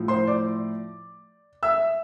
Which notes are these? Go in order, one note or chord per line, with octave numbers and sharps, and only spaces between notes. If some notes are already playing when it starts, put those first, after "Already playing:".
Already playing: A2 F3
C5 C6
D5 D6
E5 E6